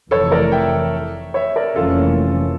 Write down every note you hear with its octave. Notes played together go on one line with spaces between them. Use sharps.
F1 F2 E3 A4 C#5
A#4 D5
E5 G5
C#5 E5
A#4 D5
F1 F2 E3 A#3 C#4 F4 A4